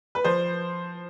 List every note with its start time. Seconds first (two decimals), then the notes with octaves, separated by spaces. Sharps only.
0.15 B4
0.24 F3 C5